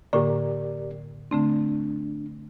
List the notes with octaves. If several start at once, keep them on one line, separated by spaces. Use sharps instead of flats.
A2 D3 A#3 G4 A#4 D5
D3 A3 C4 D4